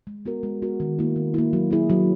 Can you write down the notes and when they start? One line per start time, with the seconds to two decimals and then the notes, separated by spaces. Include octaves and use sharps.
0.07 G#3
0.26 B3 F#4 A#4
0.43 G#3
0.62 B3 F#4 A#4
0.80 D#3
0.99 A#3 E4
1.16 D#3
1.34 A#3 E4
1.53 F#3
1.71 A#3 E4 G#4
1.90 F#3